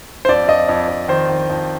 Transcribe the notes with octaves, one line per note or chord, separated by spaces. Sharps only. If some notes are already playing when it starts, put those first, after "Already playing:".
C5
F2 D5
F2 D#5
F2
F2
D#3 C5
D#3
F2